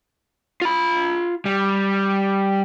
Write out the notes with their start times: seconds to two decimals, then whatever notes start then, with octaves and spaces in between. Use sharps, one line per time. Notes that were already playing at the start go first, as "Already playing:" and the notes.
0.62 F4 B5
1.45 G3